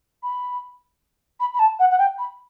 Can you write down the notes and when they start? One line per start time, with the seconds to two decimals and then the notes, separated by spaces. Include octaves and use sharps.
0.23 B5
1.40 B5
1.54 B5
1.59 A5
1.79 F#5
1.91 F#5
1.99 G5
2.18 B5